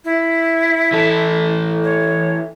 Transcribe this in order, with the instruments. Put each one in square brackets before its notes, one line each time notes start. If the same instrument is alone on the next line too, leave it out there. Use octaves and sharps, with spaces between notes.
[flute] E4
[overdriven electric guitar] E3 A4
[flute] C#5